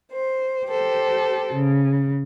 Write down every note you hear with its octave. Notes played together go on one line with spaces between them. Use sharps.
C5
G4 A4 C5
C#3